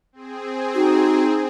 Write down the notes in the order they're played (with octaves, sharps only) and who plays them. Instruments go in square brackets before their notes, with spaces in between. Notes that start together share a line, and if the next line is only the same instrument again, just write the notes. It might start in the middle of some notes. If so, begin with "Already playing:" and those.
[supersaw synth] C4 G#4
[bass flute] D#4 [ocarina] F#4